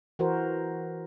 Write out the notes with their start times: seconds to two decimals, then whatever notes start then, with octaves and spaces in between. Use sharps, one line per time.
0.19 E3 F#4 A#4 C5